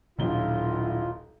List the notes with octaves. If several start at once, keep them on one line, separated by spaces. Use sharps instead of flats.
D#1 B1 A#2 F#3 D4 E4 F4 G7